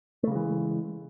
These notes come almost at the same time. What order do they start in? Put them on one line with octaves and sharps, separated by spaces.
A3 C#3 G#3 E3